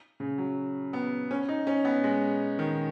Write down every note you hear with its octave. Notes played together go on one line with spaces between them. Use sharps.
C#3
F#3
B3
C#4
D#4
C#4
B3
G#3
D#3